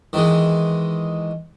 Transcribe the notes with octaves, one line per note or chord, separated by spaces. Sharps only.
D#3 E3 G#3